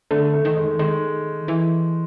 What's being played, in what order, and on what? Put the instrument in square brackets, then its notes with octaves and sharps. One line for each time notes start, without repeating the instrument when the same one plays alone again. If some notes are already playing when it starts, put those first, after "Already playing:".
[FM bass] D3 [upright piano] A3
[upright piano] A3
[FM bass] D#3
[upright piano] G#3
[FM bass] D#3 [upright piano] G#3
[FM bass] E3